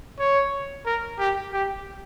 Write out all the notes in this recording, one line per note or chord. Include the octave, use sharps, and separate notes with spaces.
C#5
A#4
G4
G4